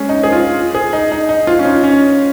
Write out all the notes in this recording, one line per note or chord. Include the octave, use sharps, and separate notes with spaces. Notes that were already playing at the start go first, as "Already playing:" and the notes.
Already playing: G#3 C#4
D#4
G#4
F4
G#4
D#4
D#4
D#4
F4
C#4
D#4
C#4